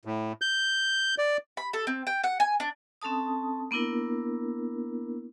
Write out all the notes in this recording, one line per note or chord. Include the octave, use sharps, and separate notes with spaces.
A2
G6
D5
B5
A4
C4
G5
F#5
G#5
D4
C4 C#4 A4 A5 D#6
A#3 B3 D4 E4 A#4